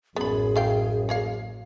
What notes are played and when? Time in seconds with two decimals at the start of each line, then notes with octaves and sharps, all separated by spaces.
0.16 A1 F#2 B3 G#4 B5
0.56 A3 F5 G5
1.09 A#3 C#5 F5